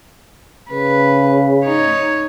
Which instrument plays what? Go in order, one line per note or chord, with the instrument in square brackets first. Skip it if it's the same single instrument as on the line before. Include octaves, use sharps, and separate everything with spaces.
[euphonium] C#3 [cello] B4
[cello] D#4 C#5